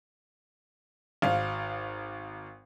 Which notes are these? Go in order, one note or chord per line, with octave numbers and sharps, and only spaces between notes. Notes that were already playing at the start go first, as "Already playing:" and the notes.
G#1 F5